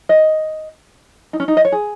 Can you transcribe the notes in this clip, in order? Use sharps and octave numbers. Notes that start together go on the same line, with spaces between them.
D#5
D#4
C#4
D#4
D#5
C#5
G#4